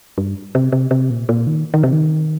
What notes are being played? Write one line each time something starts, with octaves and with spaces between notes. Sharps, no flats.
G2
C3
C3
C3
A#2
A#2
D#3
D#3
C3
D#3